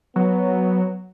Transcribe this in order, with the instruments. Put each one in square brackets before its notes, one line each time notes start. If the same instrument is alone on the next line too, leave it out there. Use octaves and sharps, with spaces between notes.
[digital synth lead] F#3 [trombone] B3